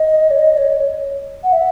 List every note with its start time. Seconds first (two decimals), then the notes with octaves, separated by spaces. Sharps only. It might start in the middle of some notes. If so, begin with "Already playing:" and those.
Already playing: D#5
0.31 C#5
0.39 D#5
0.57 C#5
1.43 F#5
1.52 E5